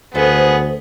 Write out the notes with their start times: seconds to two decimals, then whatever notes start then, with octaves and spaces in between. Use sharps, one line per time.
0.14 D2 B3 G#4 A4 C5 E5